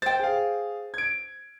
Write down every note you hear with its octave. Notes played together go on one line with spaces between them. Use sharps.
C5 G5 A6
G#4 F5
G#6 D7